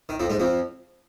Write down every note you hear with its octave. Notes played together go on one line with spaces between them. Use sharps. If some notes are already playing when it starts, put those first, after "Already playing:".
D#3
F2 F3
G#2 G#3
F2 F3